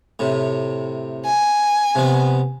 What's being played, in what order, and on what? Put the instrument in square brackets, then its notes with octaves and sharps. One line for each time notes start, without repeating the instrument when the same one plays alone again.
[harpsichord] A2 C3
[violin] G#5
[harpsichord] C3 F3 B3